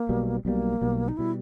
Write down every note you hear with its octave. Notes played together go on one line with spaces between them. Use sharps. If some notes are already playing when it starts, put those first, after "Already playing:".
Already playing: A#3
B1 B2 G3
B1 B2 G3 A#3
B1 B2 G3
D#4
B2 G3 E4